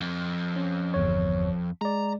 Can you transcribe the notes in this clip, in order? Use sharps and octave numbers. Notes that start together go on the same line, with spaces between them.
F2
C#4
G1 E2 C#5
G#3 D5 A#5